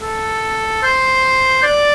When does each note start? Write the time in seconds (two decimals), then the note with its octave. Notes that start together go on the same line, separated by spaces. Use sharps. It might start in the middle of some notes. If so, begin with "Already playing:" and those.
0.01 A4
0.83 C5
1.63 D5